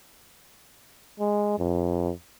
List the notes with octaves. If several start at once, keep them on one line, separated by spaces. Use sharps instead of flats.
G#3
F2